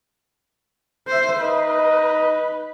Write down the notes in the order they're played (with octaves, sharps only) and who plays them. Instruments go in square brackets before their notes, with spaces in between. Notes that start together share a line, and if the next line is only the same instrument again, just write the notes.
[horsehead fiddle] C5 E5
[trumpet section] D#4 D#5 [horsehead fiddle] B4